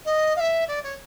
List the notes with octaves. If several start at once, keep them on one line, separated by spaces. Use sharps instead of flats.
D#5
F5
E5
D5
C#5